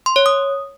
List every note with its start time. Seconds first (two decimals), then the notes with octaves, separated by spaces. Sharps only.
0.06 C6
0.16 C#5
0.26 D#6